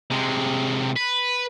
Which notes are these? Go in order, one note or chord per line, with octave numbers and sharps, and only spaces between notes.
C3 G#3
B4